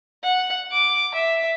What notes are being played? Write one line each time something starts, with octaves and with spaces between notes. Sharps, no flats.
F#5
D6
E5